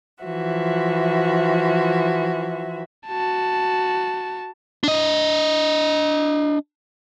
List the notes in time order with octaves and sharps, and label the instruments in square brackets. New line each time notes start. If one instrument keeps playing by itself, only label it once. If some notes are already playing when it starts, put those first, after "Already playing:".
[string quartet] E3 F3 F#4 E5
[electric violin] F#4 A5
[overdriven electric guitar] D4 D#5